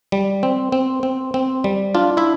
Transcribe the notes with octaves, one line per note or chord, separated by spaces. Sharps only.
G3
C4
C4
C4
C4
G3
D4 F4
E4 E5